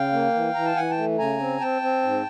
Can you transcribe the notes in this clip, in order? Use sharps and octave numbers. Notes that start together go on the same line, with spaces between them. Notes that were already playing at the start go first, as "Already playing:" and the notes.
Already playing: C#3 F5 G5
A#3
E3
E3 A#5
A5
E3 F#5 G#5
G5 A5
A3
C#3 G#5 A#5
C4
C4 G5 A5
C4
G#2